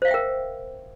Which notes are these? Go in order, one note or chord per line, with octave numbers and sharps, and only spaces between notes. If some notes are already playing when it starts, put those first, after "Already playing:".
A#4 C5 E5 F5 G5